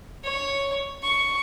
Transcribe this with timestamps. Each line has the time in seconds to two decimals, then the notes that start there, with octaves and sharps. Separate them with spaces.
0.25 C#5
1.03 C#6